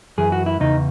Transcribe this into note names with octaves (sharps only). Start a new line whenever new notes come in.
F#2 E3 G#4
F#4
E4
E2 C#3 D#4